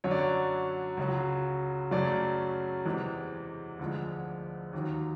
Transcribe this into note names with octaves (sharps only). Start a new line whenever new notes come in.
F#2 D3 F#3 C#5
D5
C#5
C#2 C#3 F#3
F#2 C#3 F#3 A3 D5
E2 C3 E3 G#3
D2 D3 F3 G#3
D#2 D#3 F#3